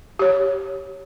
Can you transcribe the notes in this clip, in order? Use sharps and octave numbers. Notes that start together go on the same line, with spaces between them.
G4 C#5